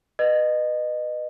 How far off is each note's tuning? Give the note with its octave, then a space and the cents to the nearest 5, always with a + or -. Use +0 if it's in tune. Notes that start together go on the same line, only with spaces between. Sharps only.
B4 +0 D#5 -25